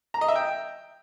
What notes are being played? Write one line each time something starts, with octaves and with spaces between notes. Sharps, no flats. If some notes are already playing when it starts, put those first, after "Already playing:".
A#5
D#5
E5
G5